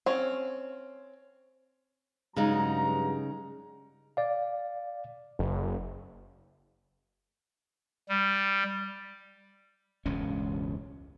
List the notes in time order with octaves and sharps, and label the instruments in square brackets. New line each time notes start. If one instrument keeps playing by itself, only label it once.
[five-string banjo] C4 C#4
[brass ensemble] G2 F#3 A#5 [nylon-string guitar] C#3 G#3 D#4
[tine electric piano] D5 F5
[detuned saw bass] F#1
[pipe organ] G3
[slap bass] E1 C#2 G2 C#4